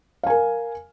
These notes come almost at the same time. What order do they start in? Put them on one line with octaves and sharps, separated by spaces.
F5 G#5 A#4